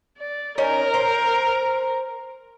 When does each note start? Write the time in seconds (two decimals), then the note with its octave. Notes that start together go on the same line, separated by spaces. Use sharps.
0.18 D5
0.58 C#4 D#4 A#4 D#5
0.94 C5